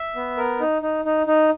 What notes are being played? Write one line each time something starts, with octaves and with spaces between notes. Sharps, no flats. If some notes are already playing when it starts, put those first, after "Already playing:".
Already playing: E5
B3
A#4
D#4
D#4
D#4
D#4